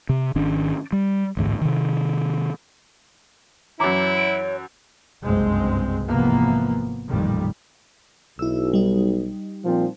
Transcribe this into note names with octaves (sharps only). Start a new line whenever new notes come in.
C3
G#1 D#3 C#4 D4
G3
A1 D2 G#2
C3 D#3
F#2 E3 E4 C#5 A#5 D6
D7
F#1 C2 G2 G#3 C4
G#1 C3 E3 F3 A#3 B3
A1 F2 A#2 D#3 G3
B1 E4 E6
G3 D#4
A#2 F3 C4